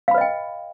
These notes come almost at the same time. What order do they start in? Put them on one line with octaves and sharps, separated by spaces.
F5 B5 B4 D#5 G5